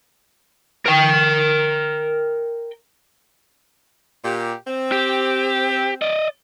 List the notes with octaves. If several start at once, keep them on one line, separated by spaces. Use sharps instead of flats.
A#4 G5
A#2 G4
C4
G4
D5 D#5